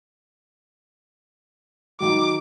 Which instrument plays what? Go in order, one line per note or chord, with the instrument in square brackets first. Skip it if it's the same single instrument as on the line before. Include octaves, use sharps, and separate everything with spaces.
[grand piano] D#3 F#3 [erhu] D6